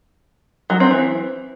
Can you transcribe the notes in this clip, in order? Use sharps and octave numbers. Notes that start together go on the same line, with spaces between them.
F#3
C4
E3